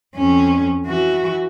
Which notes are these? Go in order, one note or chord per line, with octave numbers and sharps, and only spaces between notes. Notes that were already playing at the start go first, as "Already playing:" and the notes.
F2 C#4
E3 F#4